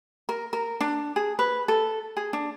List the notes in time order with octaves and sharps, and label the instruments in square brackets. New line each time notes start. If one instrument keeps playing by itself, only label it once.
[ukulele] A#4
A#4
D4
G#4
B4
A4
G#4
D4